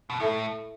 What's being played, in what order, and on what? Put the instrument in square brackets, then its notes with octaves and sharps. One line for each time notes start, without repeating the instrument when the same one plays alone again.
[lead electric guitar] B2
[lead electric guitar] A2 [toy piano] E4 A4 E5